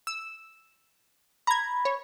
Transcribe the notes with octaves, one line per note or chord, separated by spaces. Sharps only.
E6
A#5 B5 G#6
C#5